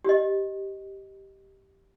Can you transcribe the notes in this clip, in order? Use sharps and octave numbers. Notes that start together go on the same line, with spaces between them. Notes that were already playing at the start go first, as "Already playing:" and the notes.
G4 D#5